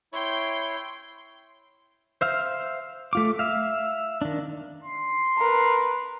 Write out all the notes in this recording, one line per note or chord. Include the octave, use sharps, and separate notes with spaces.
E4 C#5 G5 C6
C5 E5 F5
A3 F4 D6
E5 F5
D#3 D4
C6
A#4 B4